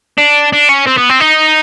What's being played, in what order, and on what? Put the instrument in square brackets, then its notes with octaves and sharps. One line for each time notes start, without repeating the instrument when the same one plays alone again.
[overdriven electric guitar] D4
D4
C#4
C4
B3
C4
D#4